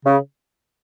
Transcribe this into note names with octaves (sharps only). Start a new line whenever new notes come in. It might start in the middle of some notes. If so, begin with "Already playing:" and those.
C#3